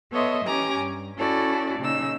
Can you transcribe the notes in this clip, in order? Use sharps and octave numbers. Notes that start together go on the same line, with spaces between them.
B3 A4 C#5 D#5 E5 C6
E3 C#4 G4 G#5 A#5 D6
G2
C#4 E4 F#4 A4 D5
A#2 C#3 D#4 E6